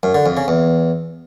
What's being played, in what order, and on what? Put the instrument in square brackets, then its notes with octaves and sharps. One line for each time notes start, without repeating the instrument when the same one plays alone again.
[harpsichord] F#2
D3
F2
C#3
E2